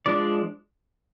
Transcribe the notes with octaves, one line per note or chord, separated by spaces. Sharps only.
F3 G#3 D4 D5